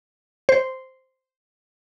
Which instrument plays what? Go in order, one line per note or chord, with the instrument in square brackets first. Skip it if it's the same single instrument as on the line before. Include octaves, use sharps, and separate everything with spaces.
[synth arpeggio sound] C5